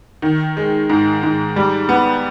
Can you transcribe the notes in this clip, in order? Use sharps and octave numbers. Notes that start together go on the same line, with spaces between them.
D#3
G#3
G#2
G#2
G3
B3